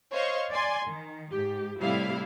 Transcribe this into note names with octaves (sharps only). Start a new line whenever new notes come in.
C5 C#5 D#5 F5 C6 C#6
D5 G#5 C6
D#3
G#2 G4
A2 C3 G3 E4 F5